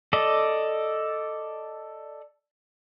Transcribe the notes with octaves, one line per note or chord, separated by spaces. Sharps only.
A4 D5 D#5